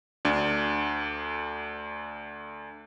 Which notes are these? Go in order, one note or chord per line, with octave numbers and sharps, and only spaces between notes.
D2 D4